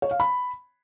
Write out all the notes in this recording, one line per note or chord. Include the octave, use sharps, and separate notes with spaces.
C#5
F5
B5